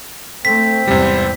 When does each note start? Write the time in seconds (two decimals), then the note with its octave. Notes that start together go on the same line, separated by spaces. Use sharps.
0.45 A3 C4 C5 B6
0.88 E2 G#2 C3 G3